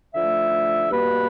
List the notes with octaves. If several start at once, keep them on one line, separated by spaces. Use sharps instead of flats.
D3 F3 A3 E5
B2 G3 A#3 B4